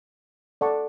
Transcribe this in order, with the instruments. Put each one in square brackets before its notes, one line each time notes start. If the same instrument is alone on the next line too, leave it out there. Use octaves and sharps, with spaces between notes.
[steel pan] A4 D5 F#5 A5 C#6